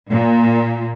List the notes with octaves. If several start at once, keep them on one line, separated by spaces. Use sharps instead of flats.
A#2